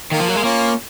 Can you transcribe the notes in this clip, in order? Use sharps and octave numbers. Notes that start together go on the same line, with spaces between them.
D#3 A#3
F3
F#3
G#3
A#3 C#4 F4